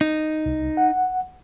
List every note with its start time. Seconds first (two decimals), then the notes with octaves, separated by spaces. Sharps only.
0.01 D#4
0.46 C2
0.77 F#5